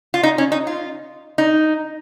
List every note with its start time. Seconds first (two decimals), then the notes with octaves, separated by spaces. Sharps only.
0.14 F4
0.23 D#4
0.38 C#4
0.52 D#4
0.67 F4
1.38 D#4